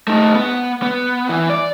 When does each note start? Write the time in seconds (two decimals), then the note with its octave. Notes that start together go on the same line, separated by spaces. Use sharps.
0.08 A3 D#4
0.35 B3
0.83 B3
1.29 E3
1.50 D5